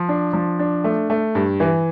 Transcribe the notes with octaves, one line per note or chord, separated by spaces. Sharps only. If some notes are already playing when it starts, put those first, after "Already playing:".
Already playing: F3
D4
F3
D4
A3
A3
G2
E3